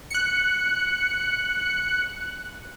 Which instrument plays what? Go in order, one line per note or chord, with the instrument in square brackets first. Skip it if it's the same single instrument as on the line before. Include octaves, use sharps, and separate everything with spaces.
[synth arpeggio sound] F#6 C#7